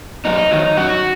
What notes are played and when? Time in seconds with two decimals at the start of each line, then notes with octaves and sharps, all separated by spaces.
0.25 F#2 D#4
0.51 D#3 F#3
0.77 F#2 F#4